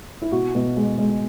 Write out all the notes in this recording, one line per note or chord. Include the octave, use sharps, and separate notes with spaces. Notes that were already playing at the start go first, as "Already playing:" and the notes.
E4
B2 F#4
B2
G#3
G#3